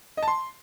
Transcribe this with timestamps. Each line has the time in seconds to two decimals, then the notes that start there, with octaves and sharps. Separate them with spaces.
0.17 D#5
0.23 A5
0.28 C6